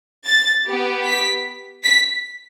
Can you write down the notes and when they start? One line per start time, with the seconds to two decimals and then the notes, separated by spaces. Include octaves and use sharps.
0.26 A6
0.66 B3 G4
1.04 B6
1.84 B6